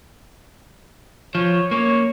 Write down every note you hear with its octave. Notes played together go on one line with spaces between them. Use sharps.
F3 C#5
A#3 C#4 C#5